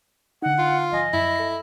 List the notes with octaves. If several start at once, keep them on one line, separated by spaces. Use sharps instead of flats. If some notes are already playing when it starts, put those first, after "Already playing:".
D3 D#4 F#5
F4
G#1 F3 D#5 G#5
F#2 E4
A4 B6